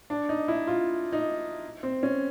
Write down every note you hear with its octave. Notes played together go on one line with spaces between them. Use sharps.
D4
D#4
E4
F4
D#4
C4
C#4